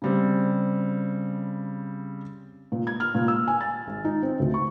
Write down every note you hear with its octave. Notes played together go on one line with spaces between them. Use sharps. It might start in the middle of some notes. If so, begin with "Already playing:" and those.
C#3 G3 C4
A#2
G#6
F6
A#2
E6
G#5
A6
G#1
D#4
C4
D2
C#6